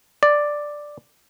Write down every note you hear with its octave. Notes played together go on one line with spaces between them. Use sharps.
D5